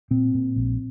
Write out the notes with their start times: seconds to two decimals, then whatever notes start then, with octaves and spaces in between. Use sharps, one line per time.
0.11 A#2 C4
0.34 A#2
0.56 A#1